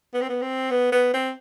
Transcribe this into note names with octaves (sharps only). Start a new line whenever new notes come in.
B3
C4
B3
C4
B3
B3
C4